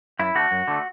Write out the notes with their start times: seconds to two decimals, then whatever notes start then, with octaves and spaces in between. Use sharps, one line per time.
0.19 F#2 E4
0.35 D3 A3 F#4
0.51 F#2
0.68 D3 A3